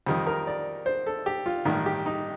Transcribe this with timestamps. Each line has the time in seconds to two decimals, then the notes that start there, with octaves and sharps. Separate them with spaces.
0.07 F2 D#3 G3
0.27 A#4
0.47 D5
0.86 C5
1.07 A4
1.26 G4
1.46 F4
1.65 A1 G2 D#3 D#4
1.86 G4
2.06 D#4